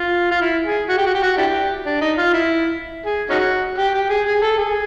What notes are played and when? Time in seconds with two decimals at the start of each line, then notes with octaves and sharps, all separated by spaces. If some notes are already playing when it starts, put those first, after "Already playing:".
Already playing: F4
0.31 F4
0.41 E4
0.66 G#4
0.89 F#4
0.98 G4
1.06 F#4
1.15 G4
1.23 F#4
1.38 D4 E4 G4
1.86 D4
2.01 D#4
2.18 F4
2.34 E4
3.06 G#4
3.30 C#4 D#4 F#4
3.78 G4
3.94 G4
4.10 G#4
4.26 G#4
4.42 A4
4.58 G#4